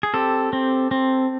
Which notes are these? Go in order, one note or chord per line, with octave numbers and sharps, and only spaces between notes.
G#4
C4 G4 A4
C4
C4